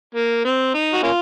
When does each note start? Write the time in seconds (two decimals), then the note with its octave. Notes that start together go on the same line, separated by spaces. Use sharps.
0.15 A#3
0.45 C4
0.74 D#4
0.93 F#4
1.03 A#3 C#4 F4